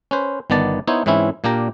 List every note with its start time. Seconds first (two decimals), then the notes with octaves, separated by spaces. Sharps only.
0.11 C#4 B4 C5
0.50 G1 D#3 B3 D5 A5
0.87 B3 D#4 E4 C5 C#5
1.06 G#2 E3 C4 C#4 E4
1.44 A#2 A#3 D4 G4 A#5